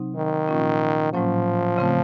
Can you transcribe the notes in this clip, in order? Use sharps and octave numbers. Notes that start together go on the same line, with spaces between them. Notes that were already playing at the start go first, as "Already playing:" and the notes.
Already playing: C3 F#3 C4 D#4
D#3
A#2 F3 A#3 C#4 F4
A2 F3 F#3 A#3 C#4
C#3 A3 C4 F4